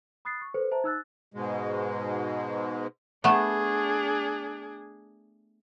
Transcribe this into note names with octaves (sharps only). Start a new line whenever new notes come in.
B5 D#6 F#6 A6 C7
C#6
A4 B4 C5 C#7
C5 E5 A5 A#5
D#4 E6 F#6 A6
G#2 B2 G#3
A3 B3 D4 G#4